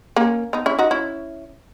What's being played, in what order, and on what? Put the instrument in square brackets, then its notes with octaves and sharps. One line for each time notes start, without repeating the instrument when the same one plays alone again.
[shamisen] A#3 C#4
B3 D#4
C#4 E4
D#4 F#4
C#4 E4